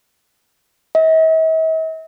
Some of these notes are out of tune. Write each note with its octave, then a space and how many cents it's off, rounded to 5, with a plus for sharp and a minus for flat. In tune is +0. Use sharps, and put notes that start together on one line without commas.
E5 -45